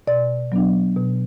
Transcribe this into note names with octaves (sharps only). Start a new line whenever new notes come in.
B2 D5
F#3 B3 D4
B2